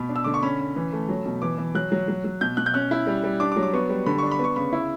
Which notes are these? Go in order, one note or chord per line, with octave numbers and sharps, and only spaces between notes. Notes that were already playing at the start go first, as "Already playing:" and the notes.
Already playing: B2 B5
D4
E6
D3 D6
C#6
C#4 B5
C#4
E3
A3
F#3
B2
E3 D6
E3
F#3 F#6
F#3
F#3
F#3
B2 G6
B2 F#6
G6
C#4 F#6
E4
G3
G3
D4 D6
D6
F#3
D6
B3 C#6
G3
D3 B5
D4 C#6
B5
B3 C#6
C#3 B5
E4